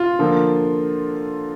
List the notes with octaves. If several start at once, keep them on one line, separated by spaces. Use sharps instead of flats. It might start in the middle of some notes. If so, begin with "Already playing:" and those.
Already playing: F4
D3 F3 A#3